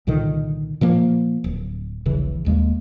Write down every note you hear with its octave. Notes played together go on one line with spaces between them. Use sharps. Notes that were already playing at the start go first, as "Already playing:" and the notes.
C2 A#2 D3 D#3
A#2 F3 A#3
D1
D#1 A#1 C#3 E3
D#1 D#2 G#3 A#3